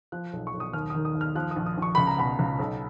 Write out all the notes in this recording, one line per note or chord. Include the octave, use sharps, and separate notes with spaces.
F3 F#6
B1
C#6
B1
D#6
D#2 F6
D#3 D#6
D#6
D#2
F6
F3 F#6
D#6
A#1
D#6
A#1
C#6
C#2 B5
A#5
B2 B5
C#2
B1